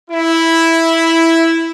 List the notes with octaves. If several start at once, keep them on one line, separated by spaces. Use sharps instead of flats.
E4